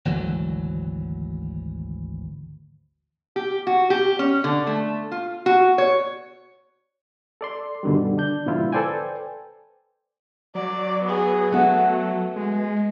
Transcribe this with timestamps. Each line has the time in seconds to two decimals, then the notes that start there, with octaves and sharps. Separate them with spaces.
0.05 G#1 D2 E3 F#3
3.36 G4
3.67 F#4
3.90 G4
4.19 C#4
4.44 D3
4.67 A3
5.12 F4
5.46 F#4
5.78 C#5
7.41 A4 D5 C6
7.83 G2 B2 D3 D#3 G3
8.18 D4 G6
8.46 G#2 B2 D3 F3 E4 F4
8.73 A4 B4 C5 D5 G5 G#5
10.55 F#3 D5
11.03 B3 G#4
11.52 A3 B3 F#4
12.36 G#3